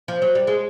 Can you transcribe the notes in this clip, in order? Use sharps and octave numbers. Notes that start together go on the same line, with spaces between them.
F3
F#3
G3
G#3